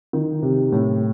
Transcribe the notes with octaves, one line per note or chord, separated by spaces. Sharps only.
D#3
C3
A2